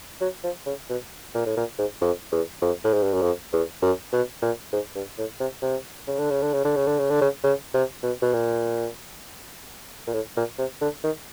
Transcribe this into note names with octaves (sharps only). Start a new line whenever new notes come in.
F#3
F3
C#3
B2
A#2
A2
A#2
G#2
F2
E2
F2
A2
G#2
G2
F#2
F2
E2
F#2
B2
A#2
G#2
G2
A2
C3
C3
C#3
D3
C#3
D3
C#3
D3
C#3
D3
C#3
D3
C#3
C#3
C3
B2
B2
A#2
A#2
A2
A#2
C3
D3
D#3